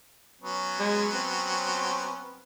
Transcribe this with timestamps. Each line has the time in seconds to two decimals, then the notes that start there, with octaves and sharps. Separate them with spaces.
0.41 F#3 B3 C#4
0.79 G#3
1.14 C4